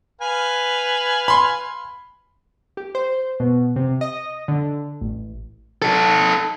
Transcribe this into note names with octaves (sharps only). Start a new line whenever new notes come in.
B4 F5 G#5
B5 C6
G4
C5
B2
C3
D#5
D3
A1
D#4 A4